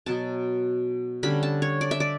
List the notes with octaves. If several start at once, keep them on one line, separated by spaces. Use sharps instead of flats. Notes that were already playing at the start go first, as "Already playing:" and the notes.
B2 F#3 B3 A5
D3 G3 C#4 B5
A5
C#5
D5
E5
D5